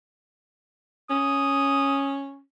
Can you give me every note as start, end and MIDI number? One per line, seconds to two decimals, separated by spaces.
1.10 2.39 61
1.10 2.15 87